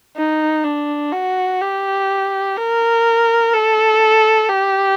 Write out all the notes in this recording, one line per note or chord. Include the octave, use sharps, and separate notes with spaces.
D#4
D4
F#4
G4
A#4
A4
G4